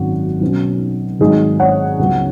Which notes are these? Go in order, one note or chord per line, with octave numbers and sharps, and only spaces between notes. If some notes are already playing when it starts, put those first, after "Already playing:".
Already playing: G#1 F#2 F#3 C#4 F#4
B1 B2 F#3 C#4
G#1 G#2 F#3 D#4 G#4
C#5 F#5
C#2 C#3 F#3 B3